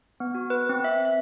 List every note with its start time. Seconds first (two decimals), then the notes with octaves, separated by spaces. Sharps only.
0.20 B3
0.35 F#4
0.50 B4
0.69 C4
0.84 E5
1.05 E5